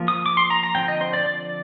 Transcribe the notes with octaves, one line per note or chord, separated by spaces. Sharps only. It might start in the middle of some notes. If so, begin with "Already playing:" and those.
Already playing: F3 A#3
D#6
D6
C6
A#5
A#5
D3 F3 C4 G5
D#5
C5
D5
D5